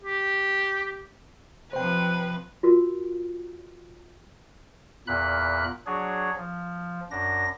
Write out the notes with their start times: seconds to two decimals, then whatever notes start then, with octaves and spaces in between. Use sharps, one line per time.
0.03 G4
1.73 C3 F3 B4 C5 G5
2.63 F4 F#4 A#4
5.07 E2 A#2 B5 F#6
5.86 F#3 D4 G#4 C#5
6.37 F3
7.11 F#2 D4 A#6